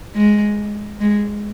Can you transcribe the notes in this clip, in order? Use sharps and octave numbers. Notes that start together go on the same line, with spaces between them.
G#3
G#3